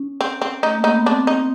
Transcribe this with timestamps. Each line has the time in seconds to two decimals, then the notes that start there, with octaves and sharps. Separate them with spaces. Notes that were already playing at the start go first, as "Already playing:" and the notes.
Already playing: C#4
0.21 C4
0.42 C4
0.63 A3 D#4
0.78 A#3
0.84 D#4
0.91 B3
1.06 C4 D4
1.27 D#4